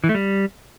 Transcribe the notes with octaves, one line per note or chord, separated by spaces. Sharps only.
E3
A3
G3